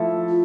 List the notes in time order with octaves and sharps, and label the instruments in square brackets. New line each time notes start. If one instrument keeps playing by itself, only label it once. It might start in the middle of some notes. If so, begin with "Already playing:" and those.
Already playing: [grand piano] F3 A3 E4 A4
[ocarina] F4